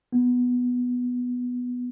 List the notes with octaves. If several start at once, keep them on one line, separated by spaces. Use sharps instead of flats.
B3